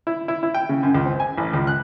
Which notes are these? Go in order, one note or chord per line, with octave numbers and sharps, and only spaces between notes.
E4
E4
E4
G5
C#3
F#2
C#2
C4
G#5
A1
C#2
F#6